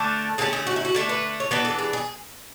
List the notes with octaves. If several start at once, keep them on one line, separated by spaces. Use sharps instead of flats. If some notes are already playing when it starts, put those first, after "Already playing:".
Already playing: D3 A3 D4 A4
D3 A3 C#4 G#4
G#4
F#4
E4
F#4
D3 A3 D4
B4
C#5
E3 B3 D4 B4
A4
G#4
G#4